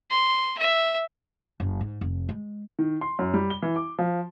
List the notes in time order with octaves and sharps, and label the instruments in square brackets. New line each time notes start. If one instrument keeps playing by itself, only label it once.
[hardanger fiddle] C6
E5
[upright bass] F#1
G#2
F1
G#3
[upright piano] D#3
C6
F#2
G3
G7
E3
D6
F3